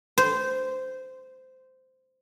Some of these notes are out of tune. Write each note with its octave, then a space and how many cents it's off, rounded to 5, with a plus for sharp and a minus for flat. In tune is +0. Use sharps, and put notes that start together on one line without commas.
C5 -15